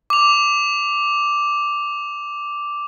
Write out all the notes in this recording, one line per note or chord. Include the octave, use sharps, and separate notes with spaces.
D6 F7